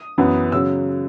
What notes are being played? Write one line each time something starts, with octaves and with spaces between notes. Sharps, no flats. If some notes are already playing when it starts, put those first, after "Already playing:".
Already playing: D#6
F#2 E3 B3
C#3 F#3 E6